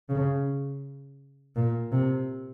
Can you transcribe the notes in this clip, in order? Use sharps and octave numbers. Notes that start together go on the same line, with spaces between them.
C#3
A#2
C3